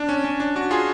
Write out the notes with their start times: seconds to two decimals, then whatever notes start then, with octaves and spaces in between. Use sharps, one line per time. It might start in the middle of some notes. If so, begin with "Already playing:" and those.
Already playing: D4
0.09 C#4
0.24 C#4
0.40 D4
0.56 D4 F#4
0.71 F4 G#4